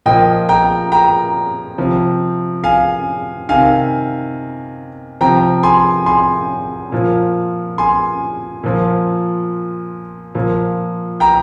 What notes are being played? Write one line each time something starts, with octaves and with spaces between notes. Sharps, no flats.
A#2 F3 D#5 G5
G5 A#5
G5 A#5
C3 F3
F5 G#5
C3 D#3 F5 G#5
C3 F3 G5 A#5
G#5 C6
G#5 C6
A#2 F3
G#5 C6
A#2 F3
A#2 F3
G5 A#5